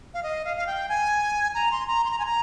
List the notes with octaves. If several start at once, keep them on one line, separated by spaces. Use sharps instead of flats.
F5
D#5
F5
F5
G5
G#5
A#5
C6
A#5
C6
A#5
G#5
A#5